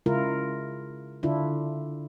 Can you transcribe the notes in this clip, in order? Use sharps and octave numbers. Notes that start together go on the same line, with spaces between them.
C#3 G#3 E4 F4 A#4
D3 D4 E4 F4